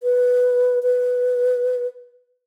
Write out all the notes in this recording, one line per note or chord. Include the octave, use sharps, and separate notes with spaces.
B4
B4